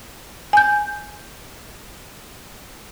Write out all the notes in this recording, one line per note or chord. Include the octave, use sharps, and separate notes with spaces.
G#5 G6